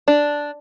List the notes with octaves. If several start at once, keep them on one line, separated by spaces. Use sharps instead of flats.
D4